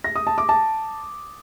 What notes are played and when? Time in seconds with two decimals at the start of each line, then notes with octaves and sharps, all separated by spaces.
0.04 A#6
0.16 D#6
0.27 A5
0.38 D6
0.49 A5